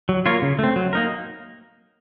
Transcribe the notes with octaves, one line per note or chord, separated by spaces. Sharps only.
F#3
A#3 F4 A#4 C#5
C#3
A3 C4
F#3
A#3 D#4 A#4